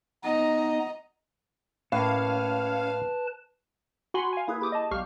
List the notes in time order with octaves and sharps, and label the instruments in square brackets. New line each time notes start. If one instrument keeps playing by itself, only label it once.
[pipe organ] B3 D#4 [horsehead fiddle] D#5 A#5
[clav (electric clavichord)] A2 A#3 [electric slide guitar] C#4 [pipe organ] B4 A5 [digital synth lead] F5
[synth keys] F#4 F#5 G#5 B5 C6
F5 G#5
A#3 E4 G#4 B4
E4 G4 D6 D#6
D#5 A5
B1 G3 G4 F5 C#6 F6